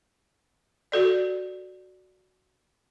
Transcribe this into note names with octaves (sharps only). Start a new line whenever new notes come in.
F#4 A4 D5